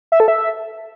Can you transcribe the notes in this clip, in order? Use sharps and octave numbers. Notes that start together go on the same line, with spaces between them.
E5
A4
E5